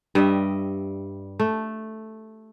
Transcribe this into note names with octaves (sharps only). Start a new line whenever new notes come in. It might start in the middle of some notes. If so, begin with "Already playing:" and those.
G2 G3 D#5 E5
A3